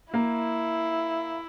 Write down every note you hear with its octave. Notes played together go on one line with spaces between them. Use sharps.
A#3 E4